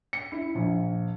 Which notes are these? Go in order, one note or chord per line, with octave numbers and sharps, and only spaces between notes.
C#7
E4
A#1